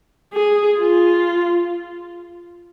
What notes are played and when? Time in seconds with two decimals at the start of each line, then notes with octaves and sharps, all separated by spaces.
0.34 G#4
0.80 F4